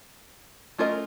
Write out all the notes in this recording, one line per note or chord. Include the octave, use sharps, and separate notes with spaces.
A3 C#4 F4 A#4 D#5